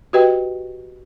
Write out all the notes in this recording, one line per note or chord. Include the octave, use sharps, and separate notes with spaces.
F#4 G4 B4 D#5 G5